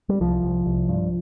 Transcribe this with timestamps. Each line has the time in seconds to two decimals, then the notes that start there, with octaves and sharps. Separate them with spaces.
0.09 G3
0.20 C2 F3
0.43 C2
0.66 C2
0.88 G2